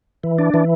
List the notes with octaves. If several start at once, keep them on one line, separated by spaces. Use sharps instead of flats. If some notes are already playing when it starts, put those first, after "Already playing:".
E3
D4
E3